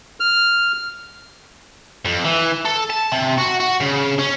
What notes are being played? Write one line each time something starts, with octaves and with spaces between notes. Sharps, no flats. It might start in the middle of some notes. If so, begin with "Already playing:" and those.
F6
F2
E3
A4
A5
C3
F#4
F#4
C#3
C#4